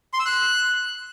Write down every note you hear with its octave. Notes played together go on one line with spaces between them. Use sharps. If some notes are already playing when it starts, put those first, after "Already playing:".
C6
E6
F#6